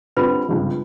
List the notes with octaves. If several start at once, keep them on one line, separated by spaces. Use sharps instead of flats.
D3 G3 C4 F4 B4 B5
G#1 C#2 G2